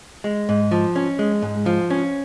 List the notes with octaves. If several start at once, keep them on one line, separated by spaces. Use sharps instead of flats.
G#3
G#2
F3
C#4
G#3
G#2
F3
C#4